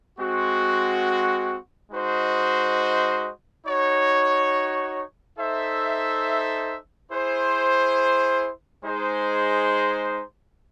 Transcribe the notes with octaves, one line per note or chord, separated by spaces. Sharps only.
G#3 C4 F#4
G#3 D#4 F#4 C5 D#5
D#4 F#4 C#5
D#4 A4 C5 E5
E4 G#4 C5
G#3 D#4 G#4 C5